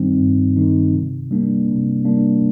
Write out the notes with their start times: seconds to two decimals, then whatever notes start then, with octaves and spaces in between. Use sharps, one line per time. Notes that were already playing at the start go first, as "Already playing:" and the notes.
Already playing: G2 D#3 G3 C4 D#4
0.20 G2
0.57 D#3 G3 C4 D#4
0.94 C3
1.31 G3 A#3 D4
1.68 C3
2.05 G3 A#3 D4